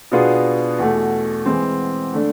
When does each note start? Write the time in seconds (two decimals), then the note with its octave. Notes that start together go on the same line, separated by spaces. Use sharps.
0.11 B2 B3 D4 F4 G#4
0.79 E2 B2 A3
1.46 E3 G#3 C4
2.13 D3 A3 D4